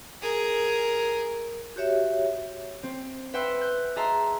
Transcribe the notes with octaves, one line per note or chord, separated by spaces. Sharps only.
G#4 A#4
F#4 G4 C#5 E5
C4
B4 E5 F#5 G5 C6 E6
F#6 G6
G#4 D#5 E5 A5 A#5 C6